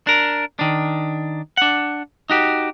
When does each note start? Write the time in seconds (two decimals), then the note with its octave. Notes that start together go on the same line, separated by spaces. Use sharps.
0.07 D4 A#4
0.59 D#3 D4
1.57 D4 F#5
2.30 D#4 F#4 G4